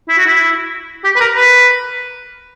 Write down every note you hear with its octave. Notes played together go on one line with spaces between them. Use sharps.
E4
F#4
E4
G4
B4
A#4
B4